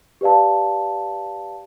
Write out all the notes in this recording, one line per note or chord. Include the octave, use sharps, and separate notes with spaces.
G4 B4 D5 F5 A5